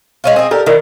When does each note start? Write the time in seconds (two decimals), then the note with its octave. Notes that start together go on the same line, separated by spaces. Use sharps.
0.24 G#3 C#4 F4
0.36 C4 G#4 D#5
0.51 G4 A4 A#4 D5
0.66 D#3 E4 A#4 D5